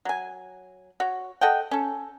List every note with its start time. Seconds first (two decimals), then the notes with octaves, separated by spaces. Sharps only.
0.05 F#3 G#5
1.00 F#4 C#5
1.41 A4 D#5 F#5 G5
1.71 C#4 A4